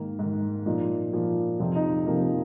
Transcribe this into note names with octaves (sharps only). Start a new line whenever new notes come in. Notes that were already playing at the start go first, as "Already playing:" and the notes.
Already playing: G#2 D#3 A#3
G#2 D#3
A#2 F3 D#4
A#2 F3
F2 C3 F3 C4
D#4
F2 C3 F3 A#3
A#3